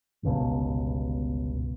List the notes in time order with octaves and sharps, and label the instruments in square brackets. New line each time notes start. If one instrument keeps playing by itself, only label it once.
[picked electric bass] G1 C#2 B2